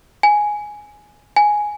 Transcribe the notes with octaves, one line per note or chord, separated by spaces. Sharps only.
G#5
G#5